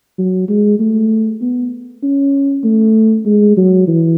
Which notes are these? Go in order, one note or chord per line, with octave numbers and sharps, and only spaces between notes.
F#3
G#3
A3
B3
C#4
A3
G#3
F#3
E3